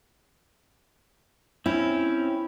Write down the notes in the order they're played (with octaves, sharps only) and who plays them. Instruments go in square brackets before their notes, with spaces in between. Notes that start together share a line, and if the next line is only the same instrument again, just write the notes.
[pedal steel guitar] C4 C#4 [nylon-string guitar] E4